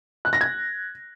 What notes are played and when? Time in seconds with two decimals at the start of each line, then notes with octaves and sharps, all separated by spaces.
0.25 F#6
0.33 A#6
0.41 G#6